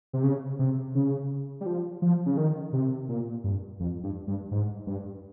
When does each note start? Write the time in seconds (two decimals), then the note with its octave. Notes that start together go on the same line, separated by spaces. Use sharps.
0.13 C3
0.23 C#3
0.59 C3
0.95 C#3
1.61 G3
1.66 F3
2.02 F3
2.26 C#3
2.37 D#3
2.73 C3
3.09 A#2
3.44 G2
3.80 F2
4.04 G2
4.27 G2
4.51 G#2
4.87 G2